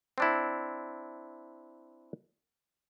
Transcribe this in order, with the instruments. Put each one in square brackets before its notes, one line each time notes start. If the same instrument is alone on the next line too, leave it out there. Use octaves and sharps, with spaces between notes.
[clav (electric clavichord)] C4 D4 E4